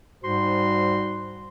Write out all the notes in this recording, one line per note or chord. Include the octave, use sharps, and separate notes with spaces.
G#2 G3 F#4 C5 C6